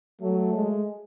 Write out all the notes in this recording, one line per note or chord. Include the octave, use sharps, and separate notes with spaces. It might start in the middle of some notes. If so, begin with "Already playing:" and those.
F#3 A3
G#3